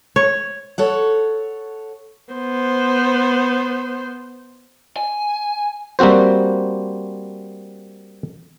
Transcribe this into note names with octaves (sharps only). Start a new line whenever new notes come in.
C#5
A4 C#5 F#5
B3 C5
G#5
G3 A#3 C4 F#4 C5